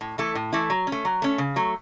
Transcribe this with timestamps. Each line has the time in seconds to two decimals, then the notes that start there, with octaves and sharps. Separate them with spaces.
0.01 A2
0.18 E3 A3 E4 A4
0.35 A2
0.53 E3 A3 E4 A4
0.70 F#3
0.87 C#4
0.92 A3
1.05 F#3
1.22 A3 C#4
1.38 C#3
1.56 F#3 A3